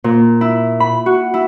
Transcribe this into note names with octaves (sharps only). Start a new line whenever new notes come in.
A#2
E4
B5
F#4
E4